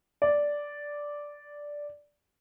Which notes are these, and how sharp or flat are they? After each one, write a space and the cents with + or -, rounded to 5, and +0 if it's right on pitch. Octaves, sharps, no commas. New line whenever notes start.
D5 -5